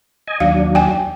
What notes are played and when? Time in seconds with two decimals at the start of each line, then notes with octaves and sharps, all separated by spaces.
0.28 D#5 G#5
0.40 D#2 F#3 D4 F5
0.75 G5 G#5